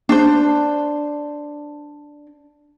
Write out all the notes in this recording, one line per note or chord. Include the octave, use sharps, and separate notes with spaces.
D4 C5